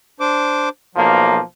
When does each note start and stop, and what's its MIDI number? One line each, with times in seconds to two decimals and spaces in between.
0.20 0.69 62
0.20 0.69 72
0.20 0.69 86
0.95 1.38 35
0.95 1.38 53
0.95 1.35 54
0.95 1.38 58